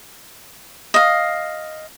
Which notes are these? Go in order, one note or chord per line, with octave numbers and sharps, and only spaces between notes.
D#5 F5